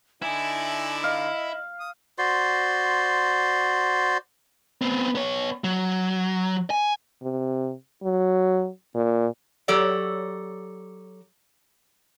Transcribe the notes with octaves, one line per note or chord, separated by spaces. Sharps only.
D3 D#4 E4 D5 G#5
D#5 F5
D#6
F#4 C5 D5 C6
B3 C4
B3 C#5
F#3
G#5
C3
F#3
A#2
F#3 G4 A4 C#5 D5 F#5